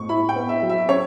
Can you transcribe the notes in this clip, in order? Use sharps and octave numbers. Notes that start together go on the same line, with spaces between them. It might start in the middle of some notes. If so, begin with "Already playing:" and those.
Already playing: A2 C#6
E4 B5
G5
B3
E5
F#3
E5
C#4 C#5